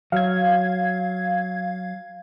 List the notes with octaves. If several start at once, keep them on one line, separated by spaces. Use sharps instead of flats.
F#3 F5 G#6